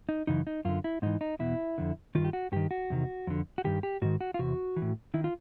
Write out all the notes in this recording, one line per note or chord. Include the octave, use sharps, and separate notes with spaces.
D#4
F#2 C#3 E3 D#4
D#4
F#2 D3 F4
E4
G#2 E3 D#4
D#4
E2 B2 E4
F2 D3
G2 D#3 F4
G4
F#4
G2 D#3 G4
F#4
E2 C3 D#3
F2 D3
F#4
G2 D#3 G4
G4
G#2 D#3 F#4
F#4
F4
E2 C3 F#4
E3
A2
D#3 E4
F4